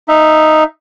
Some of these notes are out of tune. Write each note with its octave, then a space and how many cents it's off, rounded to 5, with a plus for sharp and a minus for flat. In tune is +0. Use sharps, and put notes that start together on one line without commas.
D#4 +0 E5 +0